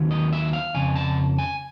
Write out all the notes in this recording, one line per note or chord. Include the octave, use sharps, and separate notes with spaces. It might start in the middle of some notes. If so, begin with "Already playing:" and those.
Already playing: D#2 D#3 F#3
D#5
E5
F5
F2 C#3 G#5
A5
G#5